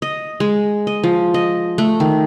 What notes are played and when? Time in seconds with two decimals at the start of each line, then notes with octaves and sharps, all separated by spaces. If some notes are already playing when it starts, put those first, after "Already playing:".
0.02 D#5
0.40 G#3
0.87 D#5
1.04 F3
1.34 D#5
1.78 A3
2.00 D#3